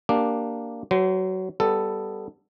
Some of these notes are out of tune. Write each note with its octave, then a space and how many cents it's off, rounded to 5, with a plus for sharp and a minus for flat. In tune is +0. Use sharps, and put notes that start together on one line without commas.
A#3 +0 D4 +0 G4 +0
F#3 +20 C5 -30
G3 +0 B3 +0 A4 +5